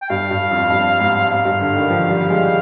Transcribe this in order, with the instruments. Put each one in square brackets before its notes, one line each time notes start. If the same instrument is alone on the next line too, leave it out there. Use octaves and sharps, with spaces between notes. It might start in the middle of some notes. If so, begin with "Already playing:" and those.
[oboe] G5
[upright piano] G2 [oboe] F5
[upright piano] G2
F2
G2
G#2
[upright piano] G#2 [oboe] F5
[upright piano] G2
D3
D#3
F3
G3
G3
G#3